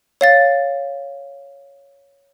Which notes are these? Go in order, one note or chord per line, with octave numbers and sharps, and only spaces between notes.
C#5 F5 A6